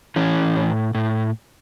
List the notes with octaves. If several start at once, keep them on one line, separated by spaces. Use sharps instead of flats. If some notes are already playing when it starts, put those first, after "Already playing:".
E3 C#4
A2
A2